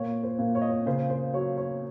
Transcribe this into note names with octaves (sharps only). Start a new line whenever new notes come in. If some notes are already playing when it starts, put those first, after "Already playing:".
Already playing: A#2 C#5
C5
A#2
C#5
D#5
C#5
C#3 C5
C5
F#3 C#5
C#5